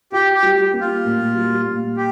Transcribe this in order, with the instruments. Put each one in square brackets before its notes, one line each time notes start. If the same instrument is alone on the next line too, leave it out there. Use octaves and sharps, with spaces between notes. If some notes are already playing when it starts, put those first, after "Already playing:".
[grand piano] F4 [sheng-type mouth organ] G4
[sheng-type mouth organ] G4
[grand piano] G3
A#3
[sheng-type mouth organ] F4
[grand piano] A#2
G3
A#2
[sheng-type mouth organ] G4